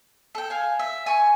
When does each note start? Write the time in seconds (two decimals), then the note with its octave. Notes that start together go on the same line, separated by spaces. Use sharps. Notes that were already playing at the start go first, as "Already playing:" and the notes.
0.35 A4 G5
0.50 F5 G#5
0.79 E5
1.06 G#5 C#6